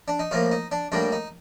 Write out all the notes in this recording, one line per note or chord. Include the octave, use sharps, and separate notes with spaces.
D4
D#4
A2 F3 A#3 F4
D#4
D4
A2 G3 A#3 D4
D#4